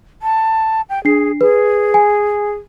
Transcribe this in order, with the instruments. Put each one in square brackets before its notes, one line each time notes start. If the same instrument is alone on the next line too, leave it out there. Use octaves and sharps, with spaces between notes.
[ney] A5
G5
[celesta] D4 C7 [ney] G#4
[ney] G#4 [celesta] B4
[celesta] G#5